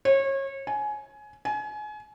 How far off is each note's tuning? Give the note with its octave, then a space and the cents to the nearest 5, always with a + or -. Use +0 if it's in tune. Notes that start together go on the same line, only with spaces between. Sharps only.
C#5 -30
G#5 +20
G#5 +30